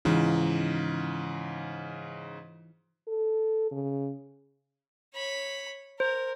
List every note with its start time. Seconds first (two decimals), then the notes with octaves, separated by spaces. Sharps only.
0.05 G#2 C#3 E3 D#4 F4
3.08 A4
3.71 C#3
5.14 C#5 B5
6.00 A#4 C5